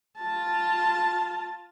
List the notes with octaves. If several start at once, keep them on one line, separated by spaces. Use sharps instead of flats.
F4 A5